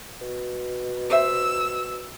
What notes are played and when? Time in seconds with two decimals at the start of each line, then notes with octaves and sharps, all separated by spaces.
0.21 B2
1.10 G4 C5 E5 E6